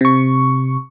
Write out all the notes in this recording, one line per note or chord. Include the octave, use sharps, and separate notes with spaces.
C3 C#6